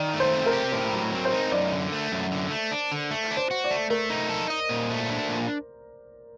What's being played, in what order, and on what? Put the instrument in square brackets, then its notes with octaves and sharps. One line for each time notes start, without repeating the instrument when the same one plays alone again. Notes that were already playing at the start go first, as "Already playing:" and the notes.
Already playing: [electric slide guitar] D#3 [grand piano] D5
[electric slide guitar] A3
[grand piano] C5
[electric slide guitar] C4
[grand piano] A#4
[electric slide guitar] G4
[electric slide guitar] A2 [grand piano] C5
[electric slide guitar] F#3
C4
[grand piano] C5
[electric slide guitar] D#4
[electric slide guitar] F#2 [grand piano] D5
[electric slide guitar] D3
A3
F#2
D3
A3
D4
D3
A3
D4
[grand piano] C5
[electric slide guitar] F#4
[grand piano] D5
[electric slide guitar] A3
[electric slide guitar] A3 [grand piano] A#4
[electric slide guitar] D#4
A4
D#5
A#2
A3
D4
A#2